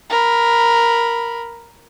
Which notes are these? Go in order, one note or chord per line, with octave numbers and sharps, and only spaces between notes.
A#4 B5